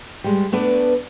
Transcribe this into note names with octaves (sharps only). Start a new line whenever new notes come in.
G3 G#3
A3 B3 D4 B4 D5